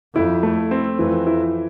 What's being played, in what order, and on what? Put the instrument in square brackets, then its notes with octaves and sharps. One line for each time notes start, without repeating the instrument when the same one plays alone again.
[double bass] F2 [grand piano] E4
[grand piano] A3
C4
[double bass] F2 [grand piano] E3
[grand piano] E4